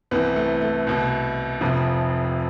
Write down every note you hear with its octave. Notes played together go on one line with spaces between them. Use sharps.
C2 C3 E3 B3
A3
A3
C2 B2
F1 F2 C3 F3